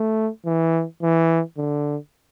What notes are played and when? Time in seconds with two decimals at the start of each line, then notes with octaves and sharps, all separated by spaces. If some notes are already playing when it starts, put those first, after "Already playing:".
Already playing: A3
0.46 E3
1.02 E3
1.58 D3